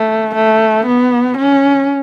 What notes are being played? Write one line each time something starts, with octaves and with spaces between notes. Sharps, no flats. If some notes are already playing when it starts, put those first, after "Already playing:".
Already playing: A3
A3
B3
C#4